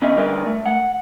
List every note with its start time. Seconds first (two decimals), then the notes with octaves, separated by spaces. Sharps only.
0.02 D#2 B3 C#4 D#5 E5
0.16 D3 G3 A#4 B4 D5
0.46 A3
0.66 F#5